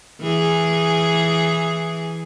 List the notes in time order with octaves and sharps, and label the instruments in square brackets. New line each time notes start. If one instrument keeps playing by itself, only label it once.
[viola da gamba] E3 G#4